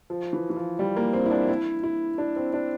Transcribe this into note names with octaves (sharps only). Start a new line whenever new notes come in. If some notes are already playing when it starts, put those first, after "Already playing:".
F3
E3
E3
F3
G3
A#3
C4
E4
D4
E4
E4
D4
C4
D4